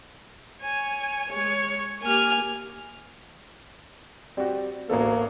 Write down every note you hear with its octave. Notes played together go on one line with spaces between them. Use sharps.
C#5 G#5
G#3 C#5
A#3 G4 G#5 F6
G3 C4 F#4
A1 D2 A#3 B3 A4